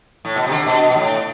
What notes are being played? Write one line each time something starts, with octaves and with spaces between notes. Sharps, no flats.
A2
B2
C3
D3
B2
B2
A2